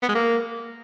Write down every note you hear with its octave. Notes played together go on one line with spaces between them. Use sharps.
B3
G#3
A#3